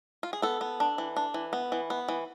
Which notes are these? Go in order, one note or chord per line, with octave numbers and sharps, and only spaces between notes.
F4
G#4
B3 A4
B3
D4
E3
D4
E3
B3
E3
B3
E3